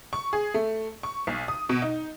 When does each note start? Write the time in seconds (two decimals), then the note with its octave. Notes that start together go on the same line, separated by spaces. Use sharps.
0.13 C#6
0.33 G#4
0.54 A3
1.03 C#6
1.27 B1
1.48 D#6
1.69 B2
1.82 D#4